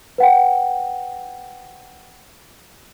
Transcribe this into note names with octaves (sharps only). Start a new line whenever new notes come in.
B4 F#5 G5